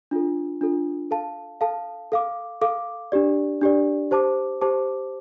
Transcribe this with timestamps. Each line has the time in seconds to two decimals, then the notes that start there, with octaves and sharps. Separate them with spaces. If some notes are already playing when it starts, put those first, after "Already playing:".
0.11 D4 F4 A4
0.61 D4 F4 A4
1.11 A4 F5 A5
1.61 A4 F5 A5
2.12 A4 F5 D6
2.61 A4 F5 D6
3.12 D4 G4 D5
3.61 D4 G4 D5
4.11 G4 C5 A5 D6
4.61 G4 C5 A5 D6